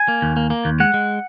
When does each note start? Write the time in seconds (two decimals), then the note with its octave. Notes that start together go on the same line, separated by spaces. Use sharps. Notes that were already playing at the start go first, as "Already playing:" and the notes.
Already playing: G#5
0.08 A#3
0.22 D#2
0.36 A#3
0.50 A#3
0.65 D#2
0.80 G#3 F#5
0.94 G#3